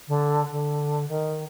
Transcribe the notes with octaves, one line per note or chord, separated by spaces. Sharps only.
D3
D3
D#3